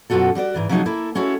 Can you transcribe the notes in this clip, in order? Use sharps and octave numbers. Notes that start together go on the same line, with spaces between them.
F#2 B2 F#3 F4 F#4 A4
G3 F#4 C5 D5
G#2 E3 D5
C3 F3 F#3 G#3 D#4 F#4
A#3 E4 A4
G#3 C#4 E4 F#4 A4